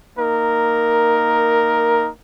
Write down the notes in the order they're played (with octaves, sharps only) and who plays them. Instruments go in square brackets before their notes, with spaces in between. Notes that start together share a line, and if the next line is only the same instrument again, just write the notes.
[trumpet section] A#3 D#4 A#4